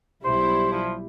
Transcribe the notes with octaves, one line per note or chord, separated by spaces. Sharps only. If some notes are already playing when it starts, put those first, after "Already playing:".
B1 G3 E4 C5
F3